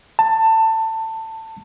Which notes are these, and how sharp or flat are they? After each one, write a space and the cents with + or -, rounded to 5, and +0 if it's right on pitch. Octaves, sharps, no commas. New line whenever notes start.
A5 +20